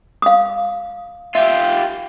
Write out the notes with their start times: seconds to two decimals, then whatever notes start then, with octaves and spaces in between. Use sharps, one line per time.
0.22 F5 D#6
1.35 F4 G4 E5